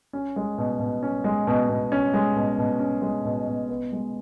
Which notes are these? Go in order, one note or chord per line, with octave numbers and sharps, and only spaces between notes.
C#4
G#3
B2
B2
C#4
G#3
B2
B2
C#4
G#3
B2
B2
C#4
G#3
B2
B2
B3
G#3